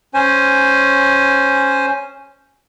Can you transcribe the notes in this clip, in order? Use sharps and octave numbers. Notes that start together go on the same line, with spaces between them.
C#4 C5 G#5